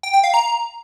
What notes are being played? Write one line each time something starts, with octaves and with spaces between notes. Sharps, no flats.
G5
G5
F5
A#5